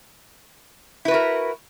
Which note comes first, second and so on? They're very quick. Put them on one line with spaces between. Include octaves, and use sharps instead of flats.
E4 B4 F#4 A#4